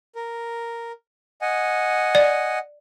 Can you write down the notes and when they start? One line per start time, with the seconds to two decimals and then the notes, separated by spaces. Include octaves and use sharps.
0.15 A#4
1.41 D#5 F#5 G#5
2.15 D5